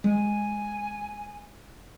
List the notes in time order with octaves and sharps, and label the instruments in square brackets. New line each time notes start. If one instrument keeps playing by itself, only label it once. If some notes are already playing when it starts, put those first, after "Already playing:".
[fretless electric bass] G#3 [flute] G#5